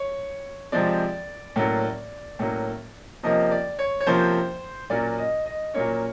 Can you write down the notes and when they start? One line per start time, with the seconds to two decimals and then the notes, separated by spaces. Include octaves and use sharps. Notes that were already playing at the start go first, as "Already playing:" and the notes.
Already playing: C#5
0.72 C3 F3 G#3 C4 D5
1.56 A2 F#3 A#3 C#4
2.39 A2 F#3 A#3 C#4
3.23 C3 F3 A#3 C#4 D#5
3.51 D5
3.79 C#5
4.00 C#5
4.07 C3 F3 A#3 C#4 C5
4.90 A#2 F#3 A#3 C#4 D5
5.18 D#5
5.46 D#5
5.74 A#2 F#3 A#3 C#4 C#5